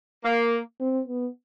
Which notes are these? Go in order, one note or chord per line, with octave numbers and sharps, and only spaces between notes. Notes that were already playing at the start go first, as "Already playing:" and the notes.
A#3
C4
B3